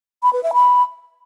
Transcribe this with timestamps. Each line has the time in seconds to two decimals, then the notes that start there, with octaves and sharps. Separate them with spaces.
0.23 B5
0.33 B4
0.43 E5
0.54 B5